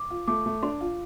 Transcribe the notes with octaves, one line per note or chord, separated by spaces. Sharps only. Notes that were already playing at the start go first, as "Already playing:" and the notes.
Already playing: D6
F4
A3 D6
A3
D4 C6
F4